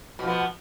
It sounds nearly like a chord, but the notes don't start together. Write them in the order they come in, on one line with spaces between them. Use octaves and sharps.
B2 F3 B3